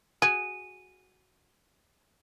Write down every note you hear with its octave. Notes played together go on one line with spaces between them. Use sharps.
F#4 G#4 D#7